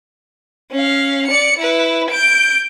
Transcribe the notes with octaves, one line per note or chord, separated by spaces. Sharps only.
C#4 F5
D5 C#7
E4 B4
G6 D7